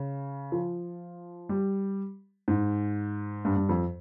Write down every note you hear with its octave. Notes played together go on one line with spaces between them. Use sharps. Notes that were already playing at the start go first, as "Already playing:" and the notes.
Already playing: C#3
F3
G3
G#2
G2
G2
F2